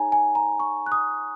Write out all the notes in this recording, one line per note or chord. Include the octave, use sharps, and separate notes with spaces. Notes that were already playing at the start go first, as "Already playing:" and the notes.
Already playing: D#4 G#4 C#5 G#5 A#5
G#5
A#5
C#6
F#6
D#6